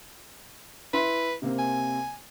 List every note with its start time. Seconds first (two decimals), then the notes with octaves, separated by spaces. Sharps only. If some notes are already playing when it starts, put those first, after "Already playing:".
0.93 E4 B4 E5 C6
1.42 C3 A#3 C4
1.59 G#5